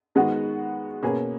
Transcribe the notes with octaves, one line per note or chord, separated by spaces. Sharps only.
D#3 G#3 B3 F#4
B2 A#3 C#4 G#4 B4